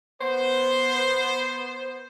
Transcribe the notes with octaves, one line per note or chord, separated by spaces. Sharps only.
B3 C5